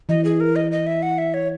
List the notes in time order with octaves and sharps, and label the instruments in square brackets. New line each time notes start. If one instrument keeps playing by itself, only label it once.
[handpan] E3 [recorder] D#5
[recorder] G#4
A#4
D#5
D#5
E5
F#5
E5
C#5